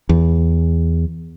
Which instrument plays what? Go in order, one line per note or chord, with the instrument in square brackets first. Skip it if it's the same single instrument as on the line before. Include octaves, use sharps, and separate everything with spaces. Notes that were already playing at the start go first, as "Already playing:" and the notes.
[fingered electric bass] E2